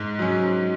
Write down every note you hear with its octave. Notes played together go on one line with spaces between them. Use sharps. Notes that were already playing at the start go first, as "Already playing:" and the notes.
Already playing: G#2
F#3 C#4